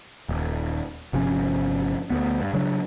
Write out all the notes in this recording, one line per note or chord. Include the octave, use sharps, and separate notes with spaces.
D#1
G1 C3 F3 C#4
D2 B3
G2
C#3 F#3 A3 D4